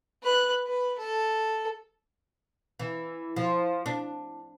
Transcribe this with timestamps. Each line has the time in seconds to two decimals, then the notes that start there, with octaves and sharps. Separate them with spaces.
0.23 B4 F#6
0.66 B4
0.98 A4
2.79 E3
3.36 F3
3.86 D4